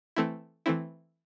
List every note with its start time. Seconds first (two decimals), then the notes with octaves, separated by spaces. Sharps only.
0.16 E3 A3 C4 E4
0.66 E3 A3 C4 E4